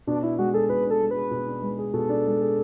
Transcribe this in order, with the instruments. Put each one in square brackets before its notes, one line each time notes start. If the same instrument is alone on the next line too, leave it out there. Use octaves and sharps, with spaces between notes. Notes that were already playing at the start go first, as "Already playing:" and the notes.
[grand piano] B2 [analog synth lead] D4
[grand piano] D4 [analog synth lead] E4
[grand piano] G#3 [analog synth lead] F#4
[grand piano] G#4 [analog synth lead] A4
[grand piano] B2 [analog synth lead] B4
[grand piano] D4
[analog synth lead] A4
[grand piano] G#3
[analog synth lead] B4
[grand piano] G#4
B2
D4
G#3
G#4
[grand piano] B2 [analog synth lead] A4
[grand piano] D4
G#3
G#4